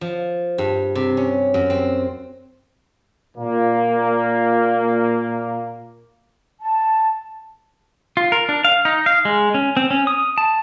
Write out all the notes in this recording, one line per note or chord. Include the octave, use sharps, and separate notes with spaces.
F3
G2
C3
C#4
F#2
C4
A#2 A#3
A5
F4
A#4
D4
F5
D#4
F5
G#3
C#4
C4
C#4
D#6
A5